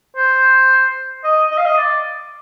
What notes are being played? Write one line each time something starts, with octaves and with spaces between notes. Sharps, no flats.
C5
D#5
D#5
F5
D#5
D5